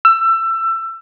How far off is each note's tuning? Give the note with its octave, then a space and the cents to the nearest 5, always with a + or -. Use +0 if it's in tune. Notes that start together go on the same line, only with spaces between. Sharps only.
E6 +25